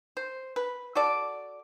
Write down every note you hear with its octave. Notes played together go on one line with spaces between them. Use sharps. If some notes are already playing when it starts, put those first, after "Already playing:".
C5
B4
F#4 A4 D5